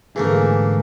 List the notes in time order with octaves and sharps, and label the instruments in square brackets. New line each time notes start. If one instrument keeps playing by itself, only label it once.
[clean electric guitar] G#2 D3 G#4 [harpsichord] E3 A3 A#3